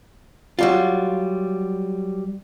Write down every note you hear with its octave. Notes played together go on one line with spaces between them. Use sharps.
F#3 G3 F4